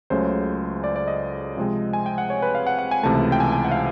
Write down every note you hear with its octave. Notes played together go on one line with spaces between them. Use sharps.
C#2 C#3 F#3 A3 C#4 C5
D5
D5
D#5
C3 F3 G#3 C4
G#5
G5
F#5
C#5
B4
F5
F#5
F#5
G#5
C#2 C3 E3 A3 A5
G5
G#5
G#5
F#5
F5